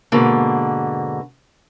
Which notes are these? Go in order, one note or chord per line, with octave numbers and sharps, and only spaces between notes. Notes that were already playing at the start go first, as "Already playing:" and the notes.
G#2 B2 D3 A#3